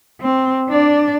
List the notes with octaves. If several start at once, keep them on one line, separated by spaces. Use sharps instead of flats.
C4
D4 D5